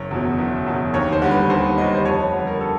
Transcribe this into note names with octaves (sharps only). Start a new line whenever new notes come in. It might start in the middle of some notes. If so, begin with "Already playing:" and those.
Already playing: F#1 C#5
E2 B2 F#3
F#1
E2 B2 F#3
D#2 C#5
C5
D3 G3
B4
D#2 C5
D3 G3 D#5
C5
F2 C#5
B4
D3 G3
A#4
A4